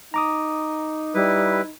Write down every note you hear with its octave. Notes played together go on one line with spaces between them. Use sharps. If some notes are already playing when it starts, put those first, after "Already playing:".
D#4 A#5 D6 D#6
G3 E4 B4